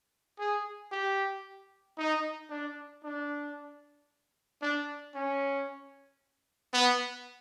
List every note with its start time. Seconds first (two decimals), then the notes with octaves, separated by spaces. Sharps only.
0.39 G#4
0.92 G4
1.98 D#4
2.50 D4
3.04 D4
4.62 D4
5.15 C#4
6.73 B3